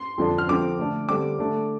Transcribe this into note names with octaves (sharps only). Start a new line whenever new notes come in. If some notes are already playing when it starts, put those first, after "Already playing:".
Already playing: C6
F2 D3 F3 D4
F6
D3 F3 C4 D6
D3 A3 D4
D3 G3 C4 D6
D3 A3 D4